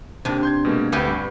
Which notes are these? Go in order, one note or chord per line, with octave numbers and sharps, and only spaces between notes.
D#2 C3 D4
C6 G6 G#6
B2 G#3 A#3
D2 B3 G4 G#5
G2